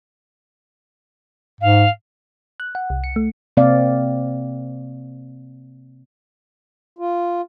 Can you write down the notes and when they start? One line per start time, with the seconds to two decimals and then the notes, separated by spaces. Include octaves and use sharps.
1.61 G#2 F5
2.60 F#6
2.75 F#5
2.90 C2
3.04 C#7
3.16 A3
3.57 C3 A#3 C4 D5 F5
6.99 F4